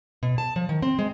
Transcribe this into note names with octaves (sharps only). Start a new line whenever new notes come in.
B2
A5
F3
D#3
C4
G#3